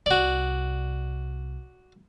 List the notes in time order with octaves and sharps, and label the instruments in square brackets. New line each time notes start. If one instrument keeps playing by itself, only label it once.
[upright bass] C2 C3 [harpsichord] F#4 D5